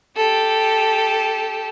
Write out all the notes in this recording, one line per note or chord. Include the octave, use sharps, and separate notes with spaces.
G4 A4